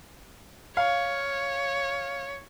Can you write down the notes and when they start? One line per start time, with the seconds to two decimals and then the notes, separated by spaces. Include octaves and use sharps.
0.77 C#5 F5